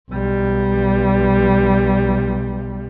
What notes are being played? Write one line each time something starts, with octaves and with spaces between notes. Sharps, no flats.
B1 G3